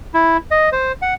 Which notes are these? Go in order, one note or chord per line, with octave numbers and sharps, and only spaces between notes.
E4
D#5
C5
F#5